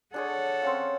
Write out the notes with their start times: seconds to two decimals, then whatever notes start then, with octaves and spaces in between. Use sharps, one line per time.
0.14 D4 G#4 A4 C#5 F#5
0.62 C4 C#4 F5